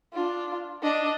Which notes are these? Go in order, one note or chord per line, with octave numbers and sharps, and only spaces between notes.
D4 F4
D4 D#5